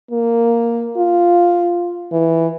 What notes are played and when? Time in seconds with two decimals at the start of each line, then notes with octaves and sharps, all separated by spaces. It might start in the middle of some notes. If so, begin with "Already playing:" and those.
0.11 A#3
0.96 F4
2.12 E3